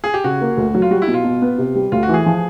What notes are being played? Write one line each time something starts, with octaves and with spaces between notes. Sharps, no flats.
G#4
G4
C#3 F#4
A#3
D2
F#3
F4
G3 F#4
E4
B2
F4
B2
B3
C3
G3
D2 F4
F#4
E3
G#4
F3